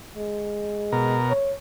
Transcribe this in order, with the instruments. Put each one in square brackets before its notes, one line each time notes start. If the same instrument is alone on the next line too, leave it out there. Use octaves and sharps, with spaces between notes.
[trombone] G#3
[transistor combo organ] B2 A#4
[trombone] C#5